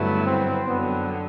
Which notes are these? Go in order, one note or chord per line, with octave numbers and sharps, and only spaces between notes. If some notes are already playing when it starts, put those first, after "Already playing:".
Already playing: G2 D3 F#3 A3 B3 E4
C4
F#2 D3 F#3 B3